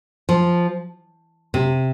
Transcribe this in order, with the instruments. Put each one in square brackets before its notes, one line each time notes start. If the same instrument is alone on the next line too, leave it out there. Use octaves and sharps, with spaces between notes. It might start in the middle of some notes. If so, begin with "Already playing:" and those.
[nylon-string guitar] F3
C3